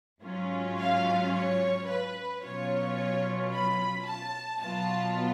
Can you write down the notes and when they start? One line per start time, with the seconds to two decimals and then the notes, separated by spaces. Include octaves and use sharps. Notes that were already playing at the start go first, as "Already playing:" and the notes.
0.22 G#2 F#3 C#4 F4
0.78 F5
1.33 C#5
1.87 B4
2.42 B2 F#3 C#4 F4 C#5
3.52 B5
4.06 A5
4.60 B2 F#3 B3 F4 A5